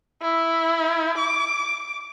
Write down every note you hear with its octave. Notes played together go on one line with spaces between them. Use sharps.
E4
D6